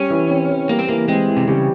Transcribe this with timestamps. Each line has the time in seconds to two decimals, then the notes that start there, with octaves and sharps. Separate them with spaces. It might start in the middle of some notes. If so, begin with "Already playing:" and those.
Already playing: G3 C#4
0.10 E3
0.30 C4
0.49 E3
0.69 G3 A#3
0.79 C4
0.89 E3 A#3
1.08 G#3 C4
1.28 E3
1.37 C3
1.48 C#3 G3